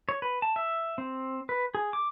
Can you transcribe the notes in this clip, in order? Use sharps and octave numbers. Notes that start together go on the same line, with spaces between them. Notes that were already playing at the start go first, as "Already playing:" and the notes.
C#5
B4
A5
E5
C4
B4
G#4
D6